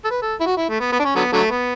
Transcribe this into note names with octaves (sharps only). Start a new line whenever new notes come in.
A4
B4
A4
E4
F#4
E4
A3
B3
B3
D4
C#4
D3 F#3 B3
D3 F#3 A3
B3